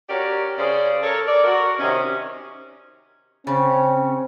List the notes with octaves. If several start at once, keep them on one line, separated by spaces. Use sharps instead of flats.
C#4 F#4 G4 A#4 C#5 D5
C#3 C#4 G#4 C5 D5
A4 A#4 C#5
D5
F#4 A#4
C3 D#3 C#4
C#3 C4 C#4